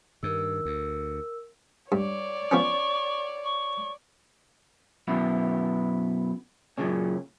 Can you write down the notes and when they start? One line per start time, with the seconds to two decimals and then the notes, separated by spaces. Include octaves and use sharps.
0.23 G2 D#3 A#4 E6
0.65 D2
1.92 G2 C#5 D5
2.51 F3 B3 C#4 C#6
3.44 C#6
5.08 F#2 B2 B3 E4
6.78 F#2 A#2 C#3 C#4